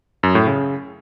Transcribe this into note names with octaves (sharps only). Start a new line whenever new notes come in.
F#2
A2
C#3